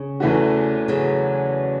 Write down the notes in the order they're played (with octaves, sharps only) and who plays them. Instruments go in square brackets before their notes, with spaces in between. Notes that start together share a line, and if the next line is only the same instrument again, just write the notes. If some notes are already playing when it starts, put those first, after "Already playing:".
Already playing: [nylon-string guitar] C#3
[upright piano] E2 E3 A3 C#4 F#4
[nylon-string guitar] C#3 F#3